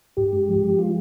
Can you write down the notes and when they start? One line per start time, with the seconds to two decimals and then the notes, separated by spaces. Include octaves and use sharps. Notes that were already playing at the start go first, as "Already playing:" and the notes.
0.17 G2 G4
0.33 G#3
0.48 F3
0.63 F3
0.79 G#3 F4